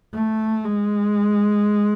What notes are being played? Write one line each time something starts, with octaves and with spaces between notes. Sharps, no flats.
A3
G#3